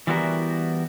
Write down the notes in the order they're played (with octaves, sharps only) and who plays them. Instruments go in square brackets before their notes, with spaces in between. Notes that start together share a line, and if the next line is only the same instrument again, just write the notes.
[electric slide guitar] E3 G3 B3 E4 F#4 A#4